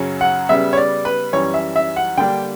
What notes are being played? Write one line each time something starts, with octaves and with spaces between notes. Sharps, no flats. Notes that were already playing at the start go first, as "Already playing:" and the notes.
Already playing: F#2 C#3 F#3 C#4
F#5
C#3 G3 B3 E5
C#5
D5
B4
F#2 E3 G3 C#4 C#5
E5
E5
F#5
D3 G3 A#3 D4 G5